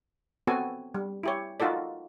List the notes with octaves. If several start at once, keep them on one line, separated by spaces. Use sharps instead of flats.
B3 C4 F#4 A4 G#5
G3
E4 G4 C#5
D#4 F4 F#4 A4 D5